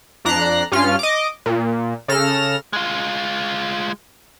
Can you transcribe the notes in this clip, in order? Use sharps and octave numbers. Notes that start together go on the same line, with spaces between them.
F2 D4 A#5 F#6 A#6 C7
G2 C#4 F4 F6
D#5 D6
A#2
C#3 A4 F6 A#6 E7
G#3 F4